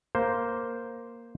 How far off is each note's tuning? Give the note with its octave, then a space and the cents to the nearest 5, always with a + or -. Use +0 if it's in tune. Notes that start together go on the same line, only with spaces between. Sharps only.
A#3 +0 C5 +0